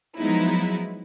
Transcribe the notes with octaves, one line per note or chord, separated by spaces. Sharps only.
F3 F#3 G#3 B3 D#4 E4